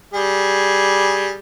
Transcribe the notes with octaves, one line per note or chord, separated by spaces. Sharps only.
G3 G#4